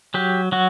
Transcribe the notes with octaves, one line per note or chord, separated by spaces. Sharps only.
F#3 G4
F#3 F#4